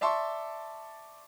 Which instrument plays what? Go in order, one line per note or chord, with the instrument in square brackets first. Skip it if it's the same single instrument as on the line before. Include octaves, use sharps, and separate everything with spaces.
[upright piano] D5 E5 A5 C6 C#6